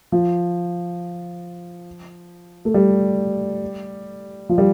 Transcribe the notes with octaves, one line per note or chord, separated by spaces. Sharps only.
F3
A3
G3
F3
G3